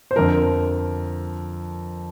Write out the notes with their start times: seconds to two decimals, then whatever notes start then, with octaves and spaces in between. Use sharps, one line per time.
0.11 C5
0.16 F2 D3 F3 A#4